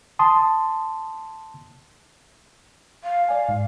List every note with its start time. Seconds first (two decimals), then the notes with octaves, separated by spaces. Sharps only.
0.19 A5 C6 D#6
3.03 F5
3.29 D5 G#5
3.49 G#2